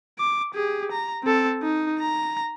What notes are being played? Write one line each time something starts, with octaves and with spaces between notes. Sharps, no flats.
D6
G4 G#4
A#5
C4 A4
D#4
A#5